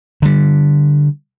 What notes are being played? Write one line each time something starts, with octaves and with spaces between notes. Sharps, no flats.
D3 G3